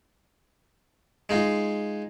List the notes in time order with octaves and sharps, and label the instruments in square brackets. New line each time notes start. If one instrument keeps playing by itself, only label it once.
[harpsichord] G#3 D#4 F4